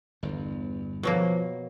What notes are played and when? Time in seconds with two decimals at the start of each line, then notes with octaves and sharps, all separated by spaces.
0.23 G1 E2
1.03 B2 F3 F#3 A#3